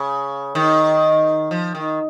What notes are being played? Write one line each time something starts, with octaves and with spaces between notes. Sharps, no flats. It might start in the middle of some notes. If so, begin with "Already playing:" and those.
Already playing: C#3
D#3
F3
D#3